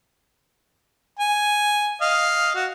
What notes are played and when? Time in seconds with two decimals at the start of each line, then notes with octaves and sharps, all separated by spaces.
1.19 G#5
2.01 D#5 F5
2.55 F#4